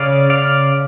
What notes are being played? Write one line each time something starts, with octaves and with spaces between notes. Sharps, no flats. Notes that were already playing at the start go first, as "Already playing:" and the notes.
Already playing: C#3 C#4 D5 F5
D5 F5